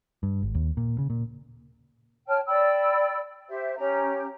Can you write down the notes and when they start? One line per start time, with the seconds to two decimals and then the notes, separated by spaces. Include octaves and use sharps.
0.23 G2
0.42 G#1
0.55 D#2
0.77 A#2
0.98 C#3
1.10 A#2
2.27 C#5 G5 A5 F6
2.47 D5 G5 B5 E6
3.49 G4 C5 E5
3.77 C#4 G4 A#5